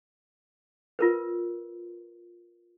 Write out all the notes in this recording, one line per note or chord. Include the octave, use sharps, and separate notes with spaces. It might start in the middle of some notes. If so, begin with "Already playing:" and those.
F4 A#4 B4